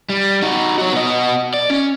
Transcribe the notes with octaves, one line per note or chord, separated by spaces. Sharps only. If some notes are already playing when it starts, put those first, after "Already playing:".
G3
D#4 F#4
F#4 C#5
B3 D#5
D5
C#4